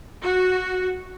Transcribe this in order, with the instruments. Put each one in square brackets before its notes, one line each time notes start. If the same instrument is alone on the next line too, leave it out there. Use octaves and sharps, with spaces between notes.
[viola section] F#4